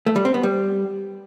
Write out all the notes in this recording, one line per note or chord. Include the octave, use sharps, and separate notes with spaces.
A3
G3
C4
B3
G3